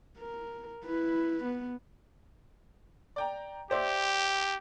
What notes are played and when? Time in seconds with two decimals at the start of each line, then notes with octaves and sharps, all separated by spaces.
0.18 A#4
0.84 E4 B4
1.44 B3
3.16 D5 G5 A#5
3.71 G4 C5 D5 E5